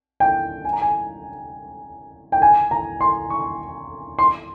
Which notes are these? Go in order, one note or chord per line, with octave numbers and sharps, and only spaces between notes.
G5
G#5
A#5
G#5
G5
G#5
A#5
C6
C#6
C6